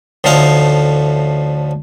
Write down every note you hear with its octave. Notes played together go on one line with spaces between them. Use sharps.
D2 A2 F3 D#4 F5 D#6